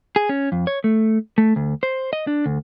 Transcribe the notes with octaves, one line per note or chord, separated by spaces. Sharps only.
G#4
C#4
F2
C#5
A3
A3
D2
C5
D#5
D4
D2